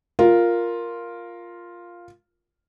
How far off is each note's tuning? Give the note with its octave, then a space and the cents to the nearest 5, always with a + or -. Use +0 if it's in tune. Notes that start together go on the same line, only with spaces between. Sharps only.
F4 +0 A#4 +0